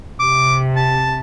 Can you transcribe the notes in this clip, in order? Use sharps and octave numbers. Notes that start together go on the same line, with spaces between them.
C3 D6
A5